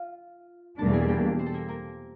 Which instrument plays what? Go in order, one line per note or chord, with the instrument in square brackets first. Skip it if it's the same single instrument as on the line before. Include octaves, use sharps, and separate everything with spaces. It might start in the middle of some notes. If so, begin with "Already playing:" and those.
Already playing: [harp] F4 F5
[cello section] E2 B2 G3 A#3 D4 [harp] A4 A5
[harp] G#4 G#5
G4 G5
C4 C5
A4
A#3 A#4
A#3 A#4